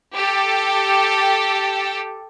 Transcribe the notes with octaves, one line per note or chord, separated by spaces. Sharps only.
G4 A4